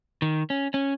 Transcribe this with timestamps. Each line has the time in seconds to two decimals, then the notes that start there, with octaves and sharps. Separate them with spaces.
0.22 D#3
0.50 C#4
0.74 C#4